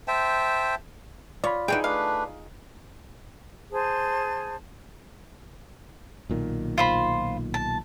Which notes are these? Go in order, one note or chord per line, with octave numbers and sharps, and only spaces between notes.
C5 E5 G5 A5
F4 C#5 D5 B5
D3 E3 D#4 G#4 G5
A3 D4 B4 F5
G#4 C5 A5
B1 A#2 D#3
F4 C5 B5
A5